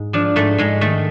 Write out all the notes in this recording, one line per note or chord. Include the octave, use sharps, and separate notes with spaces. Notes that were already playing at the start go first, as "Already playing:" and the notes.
Already playing: G#2
F3 D4
G#2 A3
G#2 G#3
D#3 A3